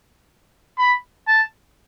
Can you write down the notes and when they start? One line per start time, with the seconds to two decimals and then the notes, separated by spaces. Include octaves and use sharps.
0.79 B5
1.28 A5